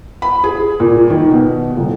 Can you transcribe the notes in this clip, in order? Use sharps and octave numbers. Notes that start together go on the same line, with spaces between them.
B5
G#4
A#2
D#3
B2
D#1